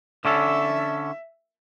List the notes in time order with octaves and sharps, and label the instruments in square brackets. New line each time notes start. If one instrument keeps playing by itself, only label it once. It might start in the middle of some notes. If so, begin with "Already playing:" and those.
[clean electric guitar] D3 C#4 A4 [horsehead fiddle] E5